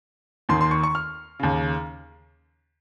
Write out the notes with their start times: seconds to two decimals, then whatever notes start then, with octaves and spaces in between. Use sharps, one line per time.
0.49 D#2 D#3 C6
0.61 C6
0.71 C#6
0.83 C#6
0.95 F6
1.40 D#2 C#3